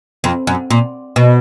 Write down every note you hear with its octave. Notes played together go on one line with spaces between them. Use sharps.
F2
F#2
A#2
B2